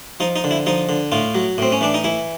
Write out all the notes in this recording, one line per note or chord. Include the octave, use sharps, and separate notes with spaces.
F3 D#4
D#4
D3
E4
F3 D#4
D3
A2 F4
F#3
A2 C4
C#4
E3 D4
D#4
E3 E4